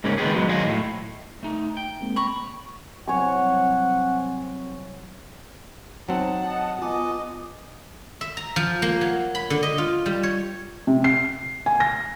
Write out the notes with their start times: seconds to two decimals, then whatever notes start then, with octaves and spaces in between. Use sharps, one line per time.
0.04 G#2 C#3 A#3 C#4
0.18 D#3 G#3 B3 G4 G#4
0.34 F#3 G#3
0.48 D#2 F#3 D#5 F5 G#5
0.65 A2
1.43 A3 D#4
1.77 G5
2.01 G#3 A#3 C4
2.16 A#5 B5 C#6
3.08 C2 F#3 C4 C#5 F#5 G#5 C#6
6.09 F#3 C4 D#4 F#5 A5
6.47 D#5
6.82 B3 F4 D#5 G#5 D6
8.21 E5
8.37 A#5
8.56 F3
8.82 A#3
9.01 F#3
9.35 B5
9.50 D3
9.63 D#5
9.78 F4
10.06 G3
10.23 C#5
10.87 C3
11.04 C7
11.66 G#5
11.80 A#6